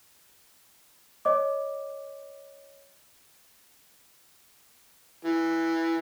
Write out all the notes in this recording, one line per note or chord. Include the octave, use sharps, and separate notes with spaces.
C#5 D#5 D6
E3